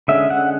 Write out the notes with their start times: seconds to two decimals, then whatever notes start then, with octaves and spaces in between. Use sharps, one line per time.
0.08 D3 G#3 C#4 E5
0.30 F#5